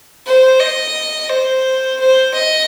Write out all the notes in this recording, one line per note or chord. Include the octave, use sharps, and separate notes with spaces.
C5
D#5
C5
C5
D#5